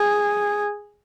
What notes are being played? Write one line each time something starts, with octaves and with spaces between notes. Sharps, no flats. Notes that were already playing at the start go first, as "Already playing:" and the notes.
Already playing: G#4